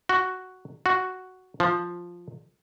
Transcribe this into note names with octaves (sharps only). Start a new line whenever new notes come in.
F#4
F#4
F3